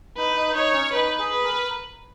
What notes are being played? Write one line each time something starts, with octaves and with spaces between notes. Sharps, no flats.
D#4 B4
D#4
D#4 C#5
C#4
D#4 B4
G#4
B4
A#4